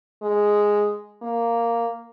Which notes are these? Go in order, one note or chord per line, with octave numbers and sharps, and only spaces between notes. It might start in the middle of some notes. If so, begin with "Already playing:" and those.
G#3
A#3